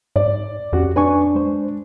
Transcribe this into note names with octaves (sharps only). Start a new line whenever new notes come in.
G#2 D5
F2 C#4 F#4 G4
D4 B4 G#5 C#6
G#3 C5